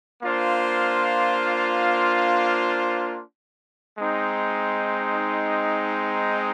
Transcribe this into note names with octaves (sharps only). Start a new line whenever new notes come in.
A#3 D4 F4 C5
G#3 C4 D#4